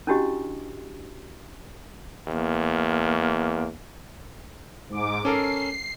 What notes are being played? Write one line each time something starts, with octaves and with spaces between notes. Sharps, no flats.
C#4 D4 E4 F#4 G4 D#5
E2 A#3
G#2 D6
C#4 A4 A#4 C7